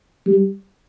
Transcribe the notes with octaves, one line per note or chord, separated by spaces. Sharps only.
G3